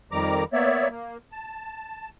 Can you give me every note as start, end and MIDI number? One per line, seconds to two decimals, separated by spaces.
0.12 0.44 41
0.12 0.44 51
0.12 0.44 55
0.12 0.44 82
0.12 0.44 86
0.53 0.88 58
0.53 0.88 59
0.53 0.88 73
0.53 0.88 74
0.53 0.88 76
0.90 1.17 58
1.32 2.09 81